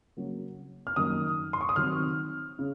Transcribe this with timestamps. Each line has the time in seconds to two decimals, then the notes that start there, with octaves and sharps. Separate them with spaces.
0.17 C#3 F#3 A#3
0.87 F6
0.96 F#2 D#3 A#3 D#4 D#6
1.53 C6
1.61 C#6
1.69 D#6
1.76 D#3 F#3 C4 F6
2.59 C#3